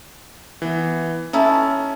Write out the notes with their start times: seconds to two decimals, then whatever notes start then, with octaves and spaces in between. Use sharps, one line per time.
0.62 E3 B3
1.33 C#4 D#4 E4 A4